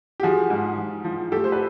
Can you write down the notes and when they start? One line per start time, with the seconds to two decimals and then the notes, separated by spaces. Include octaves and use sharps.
0.20 G4
0.23 F3 F#4 G#4
0.50 G#2
0.78 F3
1.04 F3
1.32 A3 G4 A4
1.44 C5
1.52 B4